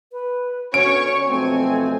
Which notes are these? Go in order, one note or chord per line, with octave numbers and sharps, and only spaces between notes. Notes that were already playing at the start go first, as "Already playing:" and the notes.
B4
D3 B3 C#4 F#4 C#5 C#6 D7
B1 F2 A3 C4 G#5